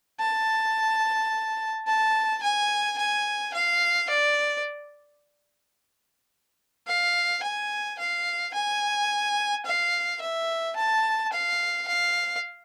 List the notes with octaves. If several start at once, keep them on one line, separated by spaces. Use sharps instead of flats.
A5
A5
G#5
G#5
F5
D5
F5
G#5
F5
G#5
F5
E5
A5
F5
F5